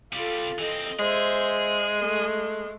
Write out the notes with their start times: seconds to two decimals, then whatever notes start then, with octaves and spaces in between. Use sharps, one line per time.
0.13 C3 G3 F4 A4
0.59 E3 C4 A4 D#5
0.99 G#3 G#4 C5 E5
1.99 A3